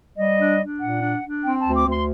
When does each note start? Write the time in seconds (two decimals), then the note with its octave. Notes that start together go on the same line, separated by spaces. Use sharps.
0.17 G3 D#5
0.38 D4
0.59 D4
0.80 A#2 F#5
1.01 D4
1.22 D4
1.43 C4 G5
1.60 A5
1.65 D2
1.76 D6
1.86 D2
1.91 C6